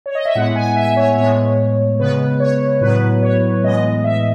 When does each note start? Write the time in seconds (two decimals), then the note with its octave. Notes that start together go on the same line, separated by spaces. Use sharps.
0.06 C#5
0.15 D#5
0.25 E5
0.35 A2 G#3 B3 F#5
0.56 G#5
0.76 E5
0.96 C#5
1.17 A2 G#3 B3 C#5
2.00 C#3 G#3 B3 B4
2.40 C#5
2.81 A2 F#3 B3 B4
3.23 C#5
3.63 A2 E3 G#3 B3 D#5
4.04 E5